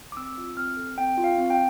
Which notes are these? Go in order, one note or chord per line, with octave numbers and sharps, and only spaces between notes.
D6
C4 E6
F4
C4 F6
A4
C4 G5
F4
F5
C4
G5